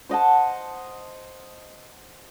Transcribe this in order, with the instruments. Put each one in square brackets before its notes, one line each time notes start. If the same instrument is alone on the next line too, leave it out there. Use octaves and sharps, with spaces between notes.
[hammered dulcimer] C5 D#5 F#5 A5